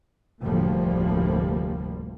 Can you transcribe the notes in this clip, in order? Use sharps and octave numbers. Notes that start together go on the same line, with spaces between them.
F1 D2 A2 F3 G3 A#3